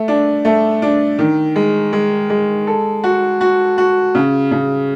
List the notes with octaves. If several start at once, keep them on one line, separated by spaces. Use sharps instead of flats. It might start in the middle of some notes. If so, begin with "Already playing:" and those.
Already playing: A3
D4
A3
D4
D#3
G#3
G#3
G#3
A4
F#4
F#4
F#4
C#3
C#3